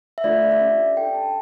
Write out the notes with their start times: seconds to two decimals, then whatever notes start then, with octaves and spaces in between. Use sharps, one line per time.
0.18 E5
0.24 A3 D4 F4 A4 D5
0.43 D5
0.51 E5
0.61 C#4 G4
0.97 D4 A4 G5
1.15 A5